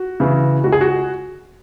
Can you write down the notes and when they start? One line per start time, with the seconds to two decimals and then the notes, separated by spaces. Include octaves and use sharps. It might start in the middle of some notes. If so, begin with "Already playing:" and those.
Already playing: F#4
0.20 C#3 E3
0.64 C#2 F#4
0.72 G#4
0.81 F#4